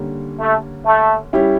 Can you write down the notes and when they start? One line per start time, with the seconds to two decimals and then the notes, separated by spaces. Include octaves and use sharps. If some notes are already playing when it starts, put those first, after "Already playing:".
Already playing: D3 G3 A#3 C#4
0.39 A3
0.86 A3
1.33 G3 C#4 E4 G4